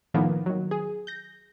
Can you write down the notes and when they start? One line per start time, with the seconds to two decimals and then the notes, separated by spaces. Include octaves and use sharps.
0.14 A2 D#3 F3 A#3 B3
0.46 D#3 F#3
0.71 G#4
1.07 G6 A#6